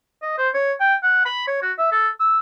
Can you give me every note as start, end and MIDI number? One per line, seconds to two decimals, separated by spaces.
0.22 0.38 75
0.38 0.49 72
0.54 0.73 73
0.80 0.95 79
1.03 1.22 78
1.25 1.43 83
1.47 1.62 73
1.62 1.72 66
1.78 1.92 76
1.92 2.09 69
2.20 2.39 88